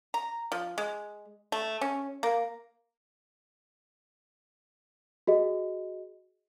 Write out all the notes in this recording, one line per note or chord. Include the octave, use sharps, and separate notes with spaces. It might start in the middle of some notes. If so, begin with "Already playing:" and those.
A#5
F3
G#3
A3
C#4
A#3
F#4 G#4 D#5